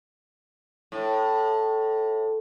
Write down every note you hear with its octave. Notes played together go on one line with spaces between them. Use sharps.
A2